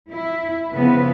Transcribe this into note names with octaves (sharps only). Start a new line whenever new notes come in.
E4
C#3 F3 B3 B4